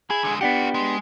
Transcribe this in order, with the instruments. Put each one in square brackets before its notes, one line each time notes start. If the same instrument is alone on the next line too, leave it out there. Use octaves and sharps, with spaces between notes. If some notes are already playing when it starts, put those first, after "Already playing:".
[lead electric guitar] E4 [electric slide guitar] G#4
[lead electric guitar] D3 G#3
[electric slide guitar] B3 D4 G4 [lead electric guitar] F4 F#5
[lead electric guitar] G#3